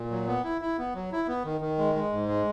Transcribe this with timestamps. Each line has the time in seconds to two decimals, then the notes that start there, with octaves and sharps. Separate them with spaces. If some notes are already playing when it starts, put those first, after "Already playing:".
Already playing: A#2
0.11 F#3
0.27 B3
0.44 E4
0.61 E4
0.78 B3
0.95 F#3
1.12 E4
1.28 B3
1.44 D#3
1.61 D#3
1.78 G#3
1.95 G#3
2.13 G#2
2.29 G#3